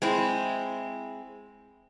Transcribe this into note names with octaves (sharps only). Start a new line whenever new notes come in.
G#3 C4 E4